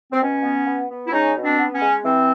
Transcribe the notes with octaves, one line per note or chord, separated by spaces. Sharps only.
C4
B2 C#4
B3
B3
B3
E4
G#3 C#4 D#4
B2
C4 D4
B3
C#4
G#3
E3 C4